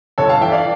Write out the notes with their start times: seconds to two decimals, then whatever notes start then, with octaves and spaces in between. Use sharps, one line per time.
0.18 G1 A4 C#5
0.29 F5 A5
0.41 E3 E5 G5
0.52 D5 F5